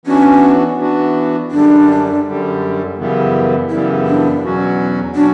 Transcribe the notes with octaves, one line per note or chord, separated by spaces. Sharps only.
E3 B3 C#4 D4 F#4
E3 B3 D4 F#4
F#2 D3 G3 D4
F#2 D3 G3
F#2 C#3 E3 G3 B3
F#2 C#3 E3 G3 B3 E4
D4
E2 B2 F#3 C#4 F#4
B2 F#3 C#4 D4 F#4